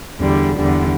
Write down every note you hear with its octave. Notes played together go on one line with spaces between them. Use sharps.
E2 D3 G3
E2 D3 G3